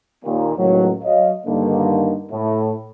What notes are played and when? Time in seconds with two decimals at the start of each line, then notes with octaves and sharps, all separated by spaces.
0.25 D#2 A#2
0.57 C#2 A2 D#3 F3 F#3
1.04 F#3 C#5 D#5 F5
1.47 G2 D3 D#3 A#3
2.32 A2